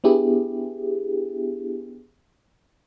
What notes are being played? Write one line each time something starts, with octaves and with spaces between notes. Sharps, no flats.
B3 D4 E4 G4 G#4